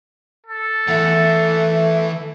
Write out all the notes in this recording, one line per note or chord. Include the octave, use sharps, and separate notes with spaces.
A4
E3 A3 F#5